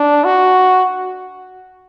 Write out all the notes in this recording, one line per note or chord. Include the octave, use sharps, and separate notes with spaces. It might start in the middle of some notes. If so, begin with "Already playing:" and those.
Already playing: D4
F#4